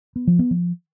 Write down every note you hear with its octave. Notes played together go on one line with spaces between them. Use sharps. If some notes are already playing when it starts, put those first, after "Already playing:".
B3
F3
B3
F3